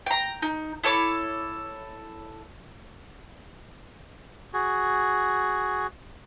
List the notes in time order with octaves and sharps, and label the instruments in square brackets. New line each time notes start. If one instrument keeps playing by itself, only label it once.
[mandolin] G5 A#5
D#4
E4 A4 C#5 D6
[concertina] F#4 G#4